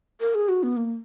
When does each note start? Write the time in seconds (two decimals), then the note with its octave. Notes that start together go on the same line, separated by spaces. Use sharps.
0.20 A#4
0.35 G#4
0.49 F#4
0.63 B3
0.77 A#3